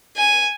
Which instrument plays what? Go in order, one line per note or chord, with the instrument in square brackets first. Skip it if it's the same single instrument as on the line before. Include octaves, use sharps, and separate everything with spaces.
[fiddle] G#5